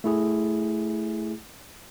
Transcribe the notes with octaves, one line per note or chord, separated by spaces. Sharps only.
A3 E4 G#4